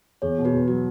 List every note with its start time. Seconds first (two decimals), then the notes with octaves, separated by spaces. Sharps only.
0.22 E2 G#4 C#5
0.38 B2
0.45 F#4 B4
0.53 E2
0.68 F#3 F#4